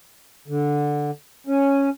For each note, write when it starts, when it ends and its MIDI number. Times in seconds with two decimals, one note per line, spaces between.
0.48 1.11 50
1.47 1.89 61